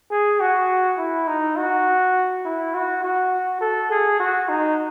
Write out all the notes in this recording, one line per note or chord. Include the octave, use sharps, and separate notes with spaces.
G#4
F#4
E4
D#4
F#4
E4
F#4
F#4
A4
G#4
F#4
D#4